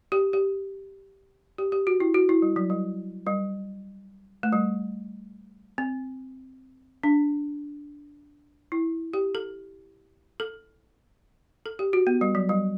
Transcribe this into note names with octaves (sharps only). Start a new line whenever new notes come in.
G4
G4
G4
G4
F#4
E4
F#4
E4
G3
F#3
G3
G3
A3
G3
C4
D4
E4
G4
A4
A4
A4
G4
F#4
B3
G3
F#3
G3